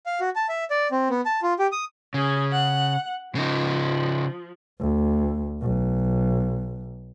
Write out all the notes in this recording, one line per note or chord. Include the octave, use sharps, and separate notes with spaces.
F5
F#4
A5
E5
D5
C4
B3
A5
F4
G4
D#6
C#3 C#4 G#4
F#5
C#3 F3 D#4
D2
B1